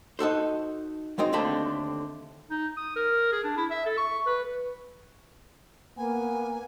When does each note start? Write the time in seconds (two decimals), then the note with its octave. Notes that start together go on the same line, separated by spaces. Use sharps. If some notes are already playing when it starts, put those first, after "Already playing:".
0.19 D#4 F#4 A4 C5
1.18 F#3 G#3 C4 D#4
1.33 D#2 D3 A3 C4 A5 B5
2.51 D#4
2.77 D#6
2.96 A#4
3.32 G#4
3.44 D4
3.57 E4
3.70 E5
3.86 A4
3.98 C#6
4.26 B4
5.97 A#3 B3 G#5